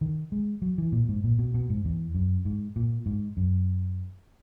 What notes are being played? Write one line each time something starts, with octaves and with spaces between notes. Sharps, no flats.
D#3
G#3
F#3
E3
A#2
G#2
A#2
B2
B2
G#2
E2
F#2
G#2
A#2
G#2
F#2